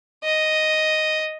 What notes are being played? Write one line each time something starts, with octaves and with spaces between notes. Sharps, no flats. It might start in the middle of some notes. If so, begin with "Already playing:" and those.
D#5